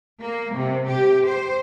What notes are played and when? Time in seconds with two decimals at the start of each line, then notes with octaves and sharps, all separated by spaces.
0.20 A#3
0.54 C3
0.87 G4
1.26 C5